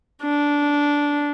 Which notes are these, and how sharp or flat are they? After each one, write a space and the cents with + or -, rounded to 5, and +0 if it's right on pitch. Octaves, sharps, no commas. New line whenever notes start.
D4 -10